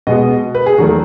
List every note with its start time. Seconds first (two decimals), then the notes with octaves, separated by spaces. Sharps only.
0.07 B2 G#3 B3 D#5
0.55 B4
0.66 G#4
0.78 E2 D#3 F#3 A3 F#4